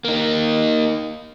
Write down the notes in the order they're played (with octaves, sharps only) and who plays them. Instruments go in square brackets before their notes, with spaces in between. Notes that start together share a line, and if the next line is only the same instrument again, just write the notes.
[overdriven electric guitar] A#3 D#4